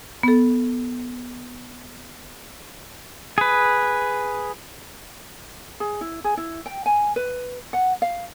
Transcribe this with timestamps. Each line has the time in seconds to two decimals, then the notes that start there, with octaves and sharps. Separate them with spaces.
0.23 B3 A4
3.38 G#4 B4
5.80 G#4
6.01 E4
6.24 G#4
6.37 E4
6.66 G5
6.86 G#5
7.16 B4
7.73 F#5
8.02 F5